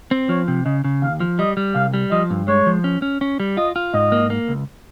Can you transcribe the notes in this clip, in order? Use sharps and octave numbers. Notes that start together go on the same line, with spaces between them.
C4
F3 C#5
C3
C#3 D#5
C#3
D#2 F5
F3
G3 D#5
G3
C2 F5
G3
F3 D#5
G2
G#3 C#5
F3
C#4
C#4
C#4
G3
F4 D#5
F4
G#2 D#5
A#3
A#3
C#2